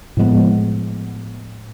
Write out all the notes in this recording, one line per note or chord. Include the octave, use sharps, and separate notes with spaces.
A2 F3 G#3 B3